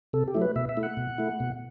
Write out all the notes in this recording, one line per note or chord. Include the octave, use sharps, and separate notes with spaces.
C3 A4
G4
F#3 A3 E4
B4
B2 E5
E5
A3 E4
F#5
B2
A3 E4
B2